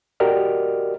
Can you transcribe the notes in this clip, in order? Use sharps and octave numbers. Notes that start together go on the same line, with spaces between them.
F#4 G4 A#4 D5 D#5 F6